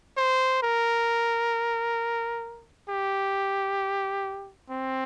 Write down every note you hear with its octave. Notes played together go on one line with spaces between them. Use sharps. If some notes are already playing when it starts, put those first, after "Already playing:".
C5
A#4
G4
C4